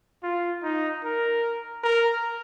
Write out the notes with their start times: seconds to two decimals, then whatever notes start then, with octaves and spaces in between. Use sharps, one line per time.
0.23 F4
0.63 D#4
1.04 A#4
1.84 A#4